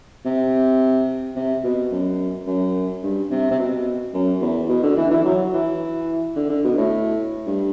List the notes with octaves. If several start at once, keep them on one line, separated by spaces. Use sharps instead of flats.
C3
C3
B2
F#2
F#2
G2
C3
C3
B2
F#2
E2
B2
D3
E3
E3
F#3
E3
D3
D3
B2
A2
G2